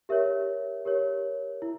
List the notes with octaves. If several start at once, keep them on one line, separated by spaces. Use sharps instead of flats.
G4 A#4 C#5 E5
G4 A#4 C#5
E4